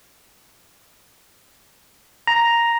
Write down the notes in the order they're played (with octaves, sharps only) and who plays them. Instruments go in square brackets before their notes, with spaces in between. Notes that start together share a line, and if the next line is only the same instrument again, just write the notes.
[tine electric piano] A#5